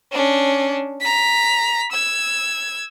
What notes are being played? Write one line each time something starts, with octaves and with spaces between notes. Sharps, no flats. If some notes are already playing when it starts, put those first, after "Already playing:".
C#4 D4
A#5 B6
E6 G#6